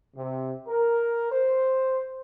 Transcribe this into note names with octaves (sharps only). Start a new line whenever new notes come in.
C3
A#4
C5